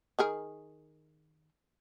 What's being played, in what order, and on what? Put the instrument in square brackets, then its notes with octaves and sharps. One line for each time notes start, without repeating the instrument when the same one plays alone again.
[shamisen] D#3 G#4 A#4